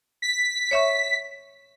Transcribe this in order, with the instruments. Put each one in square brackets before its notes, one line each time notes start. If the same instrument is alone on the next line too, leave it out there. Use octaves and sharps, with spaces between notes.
[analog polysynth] B6
[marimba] C#5 E5 C#6